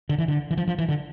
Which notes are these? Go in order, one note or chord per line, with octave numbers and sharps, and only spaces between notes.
D3
E3
D3
E3
F3
F3
E3
D3